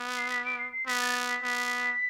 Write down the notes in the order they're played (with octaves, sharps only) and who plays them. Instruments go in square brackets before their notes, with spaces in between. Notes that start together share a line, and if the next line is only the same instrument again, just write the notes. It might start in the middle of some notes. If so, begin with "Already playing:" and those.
Already playing: [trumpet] B3
[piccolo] C7
B6
D7
C7
C7
[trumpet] B3 [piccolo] B6
[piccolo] A6
B6
[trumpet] B3